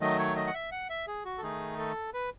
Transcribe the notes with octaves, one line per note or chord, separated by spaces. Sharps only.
D#3 F#3 A3 D#5
C#5
D#5
F#5
E5
F#5
E5
G#4
F#4
A4
D#3 A3 D#4 G#4
A4
B4